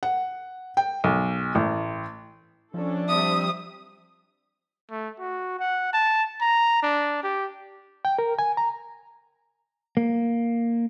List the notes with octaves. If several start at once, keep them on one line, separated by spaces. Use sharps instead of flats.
F#5
G5
B1
A1
F3 C#4 D4 A4
G3 C4 E5 D#6
A3
F#4
F#5
A5
A#5
D4
G4
G5
A#4
G#5
A#5
A#3